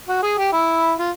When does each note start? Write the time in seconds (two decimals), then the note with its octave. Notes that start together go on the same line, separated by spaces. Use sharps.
0.09 F#4
0.22 G#4
0.38 G4
0.52 E4
0.99 F4